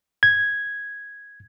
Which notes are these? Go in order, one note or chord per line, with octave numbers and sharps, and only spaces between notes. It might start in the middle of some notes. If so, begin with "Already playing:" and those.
G#6